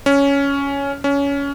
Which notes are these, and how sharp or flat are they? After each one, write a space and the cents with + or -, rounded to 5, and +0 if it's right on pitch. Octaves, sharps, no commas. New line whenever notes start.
C#4 +10
C#4 +20